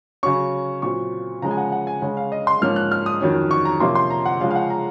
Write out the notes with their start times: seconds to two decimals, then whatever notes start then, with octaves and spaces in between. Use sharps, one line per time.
0.23 C#3 F#3 C#4 C#6
0.82 A#2 F#3 C4 C#6
1.42 C#3 F3 G#3 C#4 A#5
1.51 G#5
1.57 F#5
1.72 F#5
1.87 G#5
2.02 C#3 G#3 C#4
2.17 F5
2.32 D#5
2.47 C6
2.62 G#2 F3 A#3 C#4 F6
2.76 F#6
2.92 F6
3.06 D#6
3.21 F2 D#3 F#3 C#4
3.51 C#6
3.65 A#5
3.80 C3 F3 A#3 C#4 C6
3.95 C6
4.10 A#5
4.26 F#5
4.40 C#3 F3 G#3 C#4 F5
4.51 F5
4.56 F#5
4.70 A#5